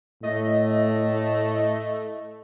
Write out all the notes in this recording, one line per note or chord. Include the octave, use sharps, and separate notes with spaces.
A2 A3 D#5